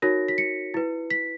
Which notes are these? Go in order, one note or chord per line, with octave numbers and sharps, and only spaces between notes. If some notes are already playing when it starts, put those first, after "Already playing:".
D#4 F#4 A#4 C#5 A#6
B6
C#7
E4 B4
B6